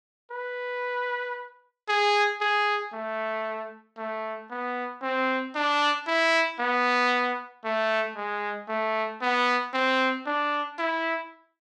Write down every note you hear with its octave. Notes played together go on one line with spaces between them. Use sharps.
B4
G#4
G#4
A3
A3
B3
C4
D4
E4
B3
A3
G#3
A3
B3
C4
D4
E4